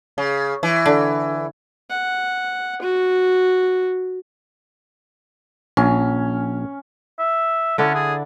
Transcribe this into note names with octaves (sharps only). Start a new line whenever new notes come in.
C#3
E3
D3
F#5
F#4
A#1 C#4
E5
D3 C#4 D4 E4
G#4